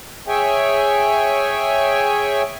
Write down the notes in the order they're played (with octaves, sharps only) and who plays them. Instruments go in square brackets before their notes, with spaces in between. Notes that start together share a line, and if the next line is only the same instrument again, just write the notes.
[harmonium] G#4 C#5 E5 G5 G#5